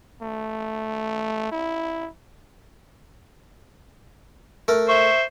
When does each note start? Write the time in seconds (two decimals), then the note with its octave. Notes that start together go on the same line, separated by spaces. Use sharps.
0.22 A3
1.52 E4
4.68 A3 A#4
4.89 C5 E5 C#6